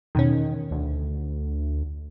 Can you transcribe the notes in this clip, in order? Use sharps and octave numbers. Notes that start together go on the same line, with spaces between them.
E2 B2 D#3 C#4
D2